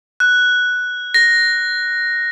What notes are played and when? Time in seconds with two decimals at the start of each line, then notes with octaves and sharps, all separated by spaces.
0.20 F#6
1.14 A#6